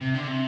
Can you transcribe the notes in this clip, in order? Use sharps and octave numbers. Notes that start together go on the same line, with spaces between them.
C3
D3
C3